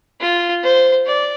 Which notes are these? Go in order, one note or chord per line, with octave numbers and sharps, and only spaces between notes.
F4
C5
D5